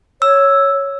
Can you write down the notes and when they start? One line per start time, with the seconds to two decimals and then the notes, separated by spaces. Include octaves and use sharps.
0.22 C#5 E6